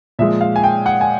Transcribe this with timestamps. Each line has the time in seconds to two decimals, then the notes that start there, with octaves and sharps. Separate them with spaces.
0.19 A#2 F3 G#3 E5
0.41 F5
0.56 G#5
0.64 G5
0.86 F#5
1.01 G#5